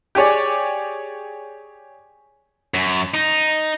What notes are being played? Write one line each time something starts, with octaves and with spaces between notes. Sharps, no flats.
G4 G#4 C#5 D5
F#2
D#4